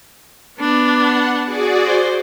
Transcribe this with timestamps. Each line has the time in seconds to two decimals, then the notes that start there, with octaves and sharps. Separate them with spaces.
0.59 B3 D4
0.97 F#5
1.45 F#4 G#4 D5
1.86 C5